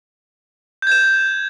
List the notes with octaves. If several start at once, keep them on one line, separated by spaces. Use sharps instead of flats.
G6 G#6 E7